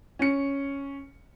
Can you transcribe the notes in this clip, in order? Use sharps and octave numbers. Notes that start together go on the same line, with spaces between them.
C#4 C#7